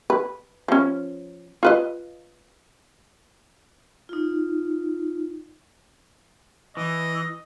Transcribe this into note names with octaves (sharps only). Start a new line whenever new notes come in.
B4
F3 C#4
F4 B4 D#5
D#4 F4
E3 D#5